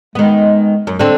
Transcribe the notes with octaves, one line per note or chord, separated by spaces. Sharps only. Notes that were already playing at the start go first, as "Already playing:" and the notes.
D#3 G#3 B3
F#2
D3 C4